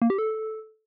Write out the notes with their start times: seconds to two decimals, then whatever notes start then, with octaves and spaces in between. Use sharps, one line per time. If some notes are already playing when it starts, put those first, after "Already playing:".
0.02 A#3
0.10 G4
0.18 A4